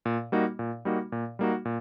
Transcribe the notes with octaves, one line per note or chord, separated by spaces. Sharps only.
A#2
G3 A#3 D#4 F#4
A#2
G3 A#3 D#4 F#4
A#2
G3 A#3 D#4 F#4
A#2